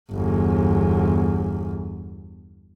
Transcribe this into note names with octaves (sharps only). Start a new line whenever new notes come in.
G1 E2